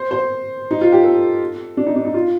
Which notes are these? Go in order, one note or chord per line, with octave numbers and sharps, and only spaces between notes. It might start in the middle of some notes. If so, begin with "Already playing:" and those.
Already playing: C5
C5
D#4
F4
G4
A4
D4
D#4
D4
D#4
F4